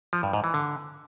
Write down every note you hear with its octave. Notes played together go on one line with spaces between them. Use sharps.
F3
G2
G#2
E3
D3